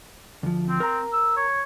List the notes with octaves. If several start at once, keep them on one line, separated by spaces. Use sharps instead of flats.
D2 F3
C4
A#4 A#5
E6
C#5